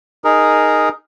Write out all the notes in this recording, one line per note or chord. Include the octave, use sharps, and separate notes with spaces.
D#4 G#4 A#4